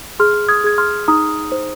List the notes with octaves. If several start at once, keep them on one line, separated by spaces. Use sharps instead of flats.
G#4 C6 F6
D#6 G#6
G#4 G#6
C6 F6
D#4 A#5 D#6
C5